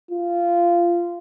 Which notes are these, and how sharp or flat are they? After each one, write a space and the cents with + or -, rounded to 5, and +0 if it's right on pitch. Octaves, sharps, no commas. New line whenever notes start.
F4 -15